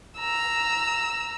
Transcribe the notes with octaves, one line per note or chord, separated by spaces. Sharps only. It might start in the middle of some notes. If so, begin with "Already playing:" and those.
A#5 E6